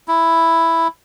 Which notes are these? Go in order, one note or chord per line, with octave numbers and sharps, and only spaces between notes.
E4